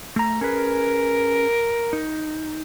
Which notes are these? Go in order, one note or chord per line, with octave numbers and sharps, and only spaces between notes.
A3 A#5
C#4 G#4 A#4 B4
D#4